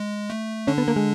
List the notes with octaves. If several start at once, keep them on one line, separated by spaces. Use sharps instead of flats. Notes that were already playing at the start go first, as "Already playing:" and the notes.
Already playing: G#3
A3
D3 C#4 D4
B3
A#3
G#3